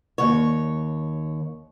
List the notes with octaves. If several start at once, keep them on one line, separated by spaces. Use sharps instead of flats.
D#2 C#5